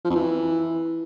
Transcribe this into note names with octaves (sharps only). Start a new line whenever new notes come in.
F3
F2
E3